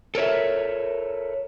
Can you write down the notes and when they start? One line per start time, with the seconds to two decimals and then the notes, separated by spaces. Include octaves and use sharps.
0.15 A4 A#4 C#5 E5